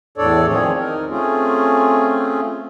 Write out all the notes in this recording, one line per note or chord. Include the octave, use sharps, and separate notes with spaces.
E2 A2 D4 A4 C#5 D5
D#3 F3 C4 G#4 C#5
D#4 A#4
A3 C4 C#4 F4 G#4